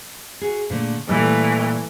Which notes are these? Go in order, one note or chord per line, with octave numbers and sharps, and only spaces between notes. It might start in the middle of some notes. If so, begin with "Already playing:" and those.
F#4 G#4
A#2 D3 A3
A#2 E3 G3 A3